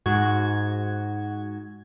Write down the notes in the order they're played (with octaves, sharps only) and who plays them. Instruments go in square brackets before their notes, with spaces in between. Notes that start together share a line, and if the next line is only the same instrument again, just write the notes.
[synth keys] G#2 F#4 G#6